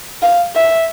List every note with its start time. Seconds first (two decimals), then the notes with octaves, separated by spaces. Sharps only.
0.22 F5
0.56 E5